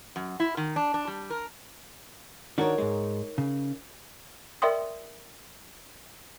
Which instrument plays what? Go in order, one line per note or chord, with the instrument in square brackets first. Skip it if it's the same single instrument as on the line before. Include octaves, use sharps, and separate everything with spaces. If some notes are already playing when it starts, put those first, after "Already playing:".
[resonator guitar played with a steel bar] F#2
E4
D#3
D4
D4
G3
A#4
[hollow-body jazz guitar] D#3 D4 F#4 [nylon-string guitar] D#4 A#4 C#5
[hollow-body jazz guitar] G#2 G#3
C#3
[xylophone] A#4 D5 E5 G5 C6 D#6